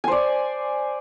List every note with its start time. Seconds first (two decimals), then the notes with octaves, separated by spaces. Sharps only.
0.04 G#5
0.08 C5
0.11 D5